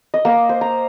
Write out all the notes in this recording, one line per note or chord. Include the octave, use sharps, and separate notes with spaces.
D#5
A#3
C5
A#5